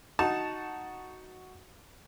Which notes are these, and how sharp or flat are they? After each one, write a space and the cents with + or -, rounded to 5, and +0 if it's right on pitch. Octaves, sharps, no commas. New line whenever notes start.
D#4 +0 F#4 +0 A5 +0